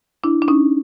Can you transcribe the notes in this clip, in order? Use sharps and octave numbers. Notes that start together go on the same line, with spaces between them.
D4 E4
D4
C#4 D#4